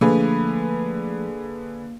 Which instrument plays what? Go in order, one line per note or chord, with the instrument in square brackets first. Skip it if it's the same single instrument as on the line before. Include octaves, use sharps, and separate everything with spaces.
[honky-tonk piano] D3 G#4 B4 [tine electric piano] F3 A3 [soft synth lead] A#3